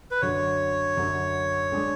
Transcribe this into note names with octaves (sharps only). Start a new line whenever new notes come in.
B4
F#2 D3 F#3 C#5
F#2 D3 F#3
G#3 D4 G#4